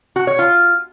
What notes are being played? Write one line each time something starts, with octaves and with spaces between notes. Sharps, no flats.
F#4
C#5
F4